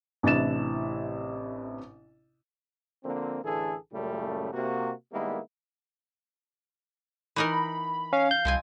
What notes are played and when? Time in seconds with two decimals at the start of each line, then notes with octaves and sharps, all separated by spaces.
0.23 A1 C3 D4 E4 A6 E7
3.04 D3 F3 A#3 C4
3.43 A1 D3 E3 G#4 A4
3.92 F#2 A#2 C#3 G3 A3
4.53 C3 A#3 F#4
5.12 D#3 G3 G#3 A#3 B3 E4
7.36 E3 D#4 A#4 B5
8.13 C#4 F5
8.31 G6
8.45 C2 B2 C4 G#5